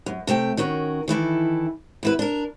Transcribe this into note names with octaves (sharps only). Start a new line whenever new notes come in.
F#2
C3 A3 E5 G5
D#3 C#4 F#4 A#4
D#3 E3 E4 A4
E2 E4 B4
D4 A#4